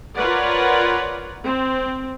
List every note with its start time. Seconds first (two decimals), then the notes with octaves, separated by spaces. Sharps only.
0.15 F4 A#4 B4 C#5 D5 F#5
1.43 C4